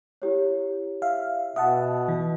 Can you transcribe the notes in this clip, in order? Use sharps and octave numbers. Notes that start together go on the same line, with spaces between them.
E4 G4 C#5
E5 F5
B2 E5 F#5 A5 D#6
E3